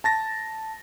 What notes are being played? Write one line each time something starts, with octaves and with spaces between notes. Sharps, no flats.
A5 A6 A#6